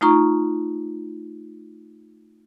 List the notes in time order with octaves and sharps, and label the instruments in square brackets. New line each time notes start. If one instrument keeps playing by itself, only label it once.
[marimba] A3 D#4 F4 A#5 C#6